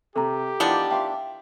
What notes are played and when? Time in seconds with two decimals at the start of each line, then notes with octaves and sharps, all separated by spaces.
0.16 C3 G4 A4 A#5
0.60 D#3 E3 B3 D4 F4 F#7
0.91 E5 F5 G5 C6